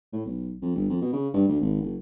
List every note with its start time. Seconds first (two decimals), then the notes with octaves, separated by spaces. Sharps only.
0.13 A2
0.26 B1
0.62 F2
0.75 G1
0.90 F2
1.02 B2
1.13 C#3
1.33 G2
1.48 D2
1.61 G#1
1.82 F#1